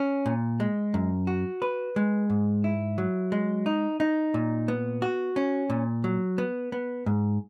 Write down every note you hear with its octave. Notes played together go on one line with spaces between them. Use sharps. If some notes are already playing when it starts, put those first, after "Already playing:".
Already playing: C#4
A#2
G#3
F#2
F#4
B4
G#3
G#2
E4
F#3
G#3
D#4
D#4
A#2
B3
F#4
C#4
A#2
F#3
B3
B3
G#2